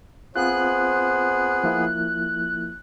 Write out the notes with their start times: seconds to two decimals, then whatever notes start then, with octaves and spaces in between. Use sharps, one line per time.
0.35 B3 C4 F4 G#4 C5 F#6
1.64 F3 A#3 E4